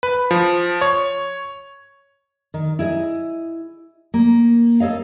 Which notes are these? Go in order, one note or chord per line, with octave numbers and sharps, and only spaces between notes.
B4
F3
C#5
D#3
E4 G#4 D#5
A#3
A4 C#5 D#5 F5